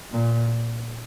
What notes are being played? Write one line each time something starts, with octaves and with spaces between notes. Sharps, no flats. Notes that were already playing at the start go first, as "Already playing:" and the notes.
A#2